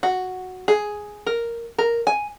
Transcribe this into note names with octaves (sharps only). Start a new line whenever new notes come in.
F#4
G#4
A#4
A#4
G#5